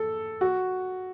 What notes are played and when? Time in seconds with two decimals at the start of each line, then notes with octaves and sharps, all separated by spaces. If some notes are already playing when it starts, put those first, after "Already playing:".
Already playing: A4
0.41 F#4